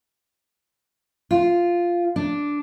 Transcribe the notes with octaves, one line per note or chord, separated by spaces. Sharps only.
F4
D4